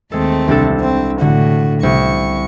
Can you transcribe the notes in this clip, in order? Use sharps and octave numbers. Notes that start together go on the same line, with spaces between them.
D#2 G#3 A3 C4 A4
C2 D4 A4
C4
A2 D3 F#4
C2 C#6